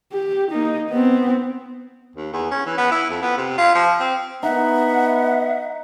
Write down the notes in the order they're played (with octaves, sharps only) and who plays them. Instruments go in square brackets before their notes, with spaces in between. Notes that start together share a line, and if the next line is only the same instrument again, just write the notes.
[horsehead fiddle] G4
A#3 D#4
B3 C4
[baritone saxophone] D#2
E2
C#4
E3
B3
E4
F2
B3
C3
F4
F3
C4
[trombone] B3 [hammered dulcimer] D#4 [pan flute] E5 [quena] F#5